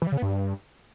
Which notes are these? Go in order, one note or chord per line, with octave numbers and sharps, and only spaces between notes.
E3
G3
C#3
B3
G2